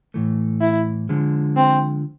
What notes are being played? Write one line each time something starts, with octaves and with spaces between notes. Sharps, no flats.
A2 E3 A3
E4
D3 F3 G#3
C4